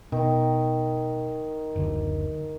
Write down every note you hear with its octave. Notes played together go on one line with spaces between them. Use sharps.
B2 D#3
F#1 D2 D3